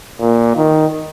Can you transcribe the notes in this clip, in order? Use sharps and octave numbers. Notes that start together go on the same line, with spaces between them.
A#2
D#3